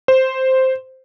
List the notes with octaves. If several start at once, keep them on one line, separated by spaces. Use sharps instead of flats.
C5